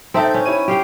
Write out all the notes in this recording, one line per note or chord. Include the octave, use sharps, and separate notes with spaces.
C4 D#4 A4 E5 A5
C#4
E4 C#5 D#7
G4 F5 G5